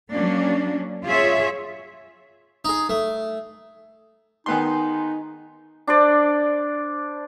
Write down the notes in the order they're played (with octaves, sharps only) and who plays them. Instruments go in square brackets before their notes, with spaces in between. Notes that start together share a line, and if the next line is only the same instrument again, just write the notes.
[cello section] F#3 A#3 C#4 D4
F4 G#4 C#5 E5
[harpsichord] D#4 G#4
A3
[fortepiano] D#3 B3 C6 [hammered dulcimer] G#3 [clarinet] D#4
[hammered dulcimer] D4 C5 D5